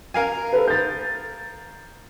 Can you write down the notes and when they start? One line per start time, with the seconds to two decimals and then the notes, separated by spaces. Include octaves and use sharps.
0.14 A#4 F5 G#5
0.53 A4 B4
0.68 G6 A6